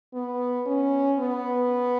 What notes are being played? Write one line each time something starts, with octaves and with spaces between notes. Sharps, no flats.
B3
C#4
B3